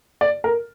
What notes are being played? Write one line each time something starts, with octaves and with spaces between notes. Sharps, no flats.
D5
A#4